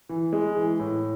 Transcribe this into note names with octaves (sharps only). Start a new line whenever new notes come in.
E3
G#3
E3
A2